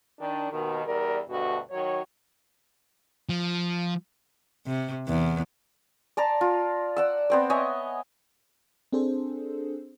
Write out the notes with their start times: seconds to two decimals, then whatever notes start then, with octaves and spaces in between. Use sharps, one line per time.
0.20 D#3 D4
0.51 D#2 B2 D#3
0.86 E2 G3 A#4 D5
1.29 D2 G2 B2 F#4
1.71 D#3 F#3 C#5
3.29 F3
4.66 C3
5.08 E2
6.17 D5 A5 A#5 C6
6.41 F4
6.97 D5 F#5 E6
7.30 B3 C4 D5
7.50 C#5 D#5 E5 G#5
8.93 C4 D4 G#4 A4 C5